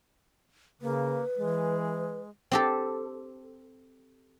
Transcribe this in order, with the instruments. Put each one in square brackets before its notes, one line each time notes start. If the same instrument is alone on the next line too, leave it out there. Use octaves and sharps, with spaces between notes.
[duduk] C#3 [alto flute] A#3 [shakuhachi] B4
[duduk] E3 [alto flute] G#3
[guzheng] C4 G4 A4